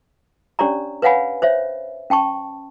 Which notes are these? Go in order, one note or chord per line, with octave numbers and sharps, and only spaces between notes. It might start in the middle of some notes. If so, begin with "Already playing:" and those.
C#4 D4 G4 C#5 D5 A#5
B4 C#5 F5 F#5 G#5 B5
C5 C#5 E5
C#4 G5 A5 C#6